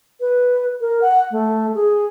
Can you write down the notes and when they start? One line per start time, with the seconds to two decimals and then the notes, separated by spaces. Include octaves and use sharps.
0.20 B4
0.81 A#4
1.01 F#5
1.31 A3
1.75 G#4